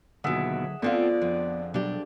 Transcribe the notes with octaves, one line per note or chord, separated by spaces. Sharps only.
D#2 B2 D3 F#3 G#4 E5 F#5
D3 F3 A3 B3 C4 F4 D5
F2
B2 F#3 G3 D4 G4